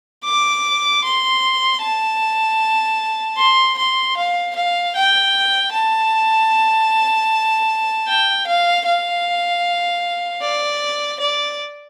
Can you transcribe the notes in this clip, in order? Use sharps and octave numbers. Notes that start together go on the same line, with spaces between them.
D6
C6
A5
C6
C6
F5
F5
G5
A5
G5
F5
F5
D5
D5